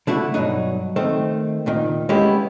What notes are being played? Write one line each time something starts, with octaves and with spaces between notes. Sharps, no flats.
D3 A3 E4 F#4
G2 B2 F#3 D#4
D#3 A3 C4
D2 A#2 D#3
G#3 A#3 B3 C#4 E4 G4